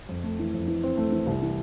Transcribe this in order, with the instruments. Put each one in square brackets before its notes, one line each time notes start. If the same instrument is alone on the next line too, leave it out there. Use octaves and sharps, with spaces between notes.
[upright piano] F2
A3
E3
F2
E3
C4
A3
E3
C2
E3